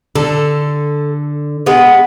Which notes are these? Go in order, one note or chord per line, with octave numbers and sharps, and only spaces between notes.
D3 A4
G#3 B3